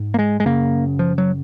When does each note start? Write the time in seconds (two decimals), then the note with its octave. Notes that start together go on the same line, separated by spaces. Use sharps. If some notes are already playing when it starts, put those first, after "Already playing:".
Already playing: G#2
0.14 A#3
0.19 G#3
0.40 G#3
0.46 F#2 C#3 A#3
0.99 F3
1.18 F#3